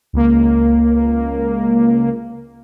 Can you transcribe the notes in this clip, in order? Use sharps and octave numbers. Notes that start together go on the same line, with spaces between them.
C#2 A#3